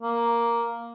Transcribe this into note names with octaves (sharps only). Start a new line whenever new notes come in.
A#3